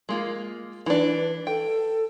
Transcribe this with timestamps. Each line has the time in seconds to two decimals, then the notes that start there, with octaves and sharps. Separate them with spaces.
0.09 G#3 A#3 F4
0.86 E3 D4 B4
1.47 A4 G5